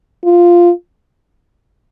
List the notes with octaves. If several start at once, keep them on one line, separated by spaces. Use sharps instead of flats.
F4